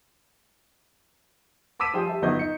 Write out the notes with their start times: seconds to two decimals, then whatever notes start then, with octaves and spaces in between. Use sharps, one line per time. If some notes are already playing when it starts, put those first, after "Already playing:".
1.80 A5 D6 E6 B6 D#7 E7
1.94 F3 G3 F4 G#4 C5 G5
2.07 G4 E5 A5
2.22 G1 D#3 F#3 B3 D#5 G6
2.39 D#4 C#7